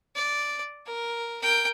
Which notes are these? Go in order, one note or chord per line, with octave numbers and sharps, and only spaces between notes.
D5
A#4
A#4 G5